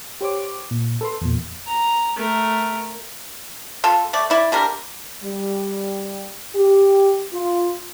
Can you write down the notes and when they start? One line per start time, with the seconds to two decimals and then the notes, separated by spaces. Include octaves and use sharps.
0.21 G4 C5 C#5 D6
0.71 A#2
1.01 A4 B4 C6
1.21 E2 A#2
1.67 A#5
2.16 A3 A#4
3.84 F4 A4
4.13 A3 D5
4.30 E4 D5
4.52 D3 G3 A#4
5.23 G3
6.55 G4
7.32 F4